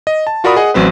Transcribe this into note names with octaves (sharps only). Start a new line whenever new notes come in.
D#5
A5
F4 F#4 A#4 D5 B5 D#6
G#4 D#5 F#5
A1 F#3 C4 B4